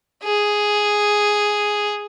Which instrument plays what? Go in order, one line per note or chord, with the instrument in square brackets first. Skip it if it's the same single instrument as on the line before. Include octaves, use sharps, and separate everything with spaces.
[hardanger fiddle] G#4